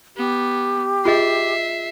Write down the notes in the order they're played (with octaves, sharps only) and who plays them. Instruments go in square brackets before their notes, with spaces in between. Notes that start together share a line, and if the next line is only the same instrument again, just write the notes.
[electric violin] B3 [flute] G4
[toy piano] F4 G#4 D#5 [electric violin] E5 C7